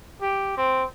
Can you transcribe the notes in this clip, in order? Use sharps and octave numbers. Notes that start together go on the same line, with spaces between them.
G4
C4